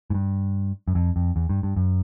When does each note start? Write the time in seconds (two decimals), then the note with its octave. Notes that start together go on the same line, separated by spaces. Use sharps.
0.10 G#2
0.14 G2
0.88 F#2
0.95 F2
1.16 F2
1.36 E2
1.49 G2
1.63 G2
1.76 F#2